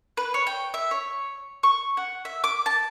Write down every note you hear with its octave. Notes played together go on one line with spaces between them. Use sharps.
B4
C#5
G5
E5
C#5
C#6
F#5
E5
D6
A5